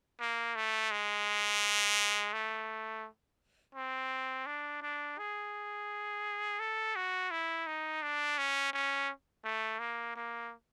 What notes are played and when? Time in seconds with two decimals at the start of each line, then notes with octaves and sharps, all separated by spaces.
0.20 A#3
0.55 A3
0.91 G#3
2.33 A3
3.75 C4
4.46 D4
4.82 D4
5.18 G#4
6.60 A4
6.96 F#4
7.31 E4
7.67 D#4
8.02 D4
8.38 C#4
8.73 C#4
9.44 A3
9.80 A#3
10.16 A#3